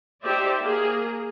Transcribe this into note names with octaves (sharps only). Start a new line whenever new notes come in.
D#4 G4 C5 D5 E5
A#3 G#4